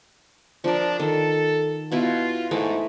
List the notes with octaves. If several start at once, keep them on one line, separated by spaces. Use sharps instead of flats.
F3 D4 A#4
D#3 A4
B2 E4 F4 B5
G#2 E3 A3